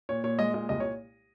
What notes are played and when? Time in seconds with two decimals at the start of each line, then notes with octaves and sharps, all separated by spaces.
0.09 A#2 C#5
0.24 A#2 C#5
0.39 G#3 D#5
0.54 A#2 D#5
0.69 C2 D#5
0.80 C#5